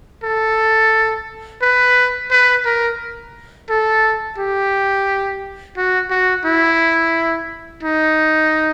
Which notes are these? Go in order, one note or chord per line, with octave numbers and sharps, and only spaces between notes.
A4
B4
B4
A#4
A4
G4
F#4
F#4
E4
D#4